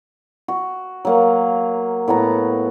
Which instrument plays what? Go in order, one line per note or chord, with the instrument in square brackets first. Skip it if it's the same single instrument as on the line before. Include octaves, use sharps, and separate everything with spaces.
[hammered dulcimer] F#4
F#3 A#3 F5
A2 B3 F#4 A#5